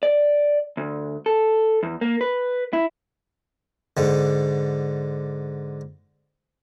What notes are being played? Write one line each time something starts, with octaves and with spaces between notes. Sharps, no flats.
D5
D2
A4
E2
A#3
B4
E4
G#2 D3